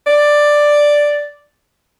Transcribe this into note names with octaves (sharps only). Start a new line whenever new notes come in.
D5